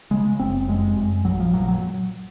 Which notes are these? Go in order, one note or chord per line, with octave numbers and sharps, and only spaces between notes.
C#3 G#3
F#1 C4
F#2 G#3
F#2
A#1 F#3
F3
A#2 F#3
F#3